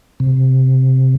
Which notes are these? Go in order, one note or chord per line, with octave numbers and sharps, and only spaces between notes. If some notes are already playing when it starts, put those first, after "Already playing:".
C3